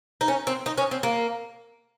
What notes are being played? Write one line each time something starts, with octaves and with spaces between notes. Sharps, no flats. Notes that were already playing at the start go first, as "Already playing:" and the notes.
D#4
C#4
C4
D#4
C#4
C4
A#3